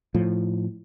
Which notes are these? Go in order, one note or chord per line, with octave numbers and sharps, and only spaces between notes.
A2 F3